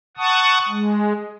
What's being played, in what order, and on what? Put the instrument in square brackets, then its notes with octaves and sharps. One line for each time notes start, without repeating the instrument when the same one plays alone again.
[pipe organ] F#5 A5 C#6 D#6
G#3